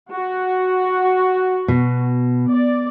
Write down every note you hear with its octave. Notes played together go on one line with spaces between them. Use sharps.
F#4
B2
D5